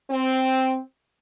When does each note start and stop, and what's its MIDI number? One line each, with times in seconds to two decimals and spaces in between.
0.11 0.80 60